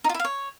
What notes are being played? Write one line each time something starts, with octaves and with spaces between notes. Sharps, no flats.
D#4
F4
E4
F5
C#5